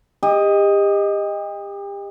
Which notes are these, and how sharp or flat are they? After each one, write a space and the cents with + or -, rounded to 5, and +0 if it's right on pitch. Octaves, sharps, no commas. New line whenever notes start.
G4 +35 D#5 +0